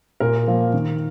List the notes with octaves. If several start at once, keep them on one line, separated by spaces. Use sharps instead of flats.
A#2 A#4
F3 A#3
D#3